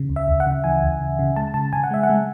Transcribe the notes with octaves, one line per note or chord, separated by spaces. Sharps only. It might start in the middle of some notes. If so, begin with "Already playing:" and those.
Already playing: C#3
D2
E5
D2
F#5
C#3
E3 G#5
D2
C#3
C#3
G#3 A5
C#3 A5
C#3 G#5
F#5
G#3 E5
F#5
G#3